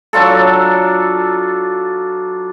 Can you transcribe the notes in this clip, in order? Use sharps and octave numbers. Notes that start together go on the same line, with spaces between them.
F#3 D4 F4 A4